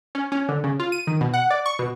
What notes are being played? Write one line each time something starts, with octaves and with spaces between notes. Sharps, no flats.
C#4
C#4
D3
C#3
F4
D#7
D#3
B2
F#5
D5
C#6
B2